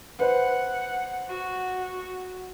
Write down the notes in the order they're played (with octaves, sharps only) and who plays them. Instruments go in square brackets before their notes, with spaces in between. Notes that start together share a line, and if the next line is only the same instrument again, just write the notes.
[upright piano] B4 C5 [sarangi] F#5
[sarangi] F#4